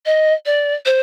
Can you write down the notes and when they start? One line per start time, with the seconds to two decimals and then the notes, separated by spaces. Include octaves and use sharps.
0.06 D#5
0.46 D5
0.86 C5